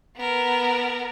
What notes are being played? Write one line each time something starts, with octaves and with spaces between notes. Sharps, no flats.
B3 A#4